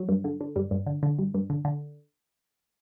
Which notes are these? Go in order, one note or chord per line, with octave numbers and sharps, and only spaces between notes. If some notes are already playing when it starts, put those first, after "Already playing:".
Already playing: F#3
G2
D3
D3
G2 G3
G2
D3
D3
G2
G2
D3
D3